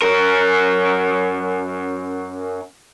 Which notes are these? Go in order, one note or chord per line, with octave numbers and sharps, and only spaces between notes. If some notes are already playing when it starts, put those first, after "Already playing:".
F#2 A#4